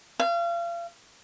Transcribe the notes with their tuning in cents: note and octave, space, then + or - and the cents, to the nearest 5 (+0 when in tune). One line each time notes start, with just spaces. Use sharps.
F5 -35